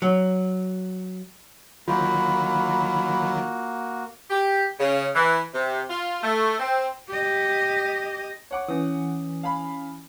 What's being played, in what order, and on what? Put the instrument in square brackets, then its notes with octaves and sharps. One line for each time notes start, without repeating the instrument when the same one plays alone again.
[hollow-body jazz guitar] F#3
[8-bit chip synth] D#3 F#3 [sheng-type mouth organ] A#3 F#4 [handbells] F4 [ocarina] B5
[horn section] G4
C#3
E3
C3
F4
A3
C4
[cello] G4 D#5
[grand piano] C#5 F#5 D6
[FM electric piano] E3 [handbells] C#4 D#6
[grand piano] F5 G#5 B5